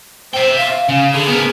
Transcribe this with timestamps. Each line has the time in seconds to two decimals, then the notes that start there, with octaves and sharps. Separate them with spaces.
0.34 C5 E5 G5
0.57 F5
0.89 C#3
1.14 D3 G#4
1.28 B3 A#4